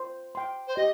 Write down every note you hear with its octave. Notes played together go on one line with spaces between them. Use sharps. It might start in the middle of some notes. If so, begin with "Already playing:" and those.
Already playing: C5
G5 C6
C5
G4 D#5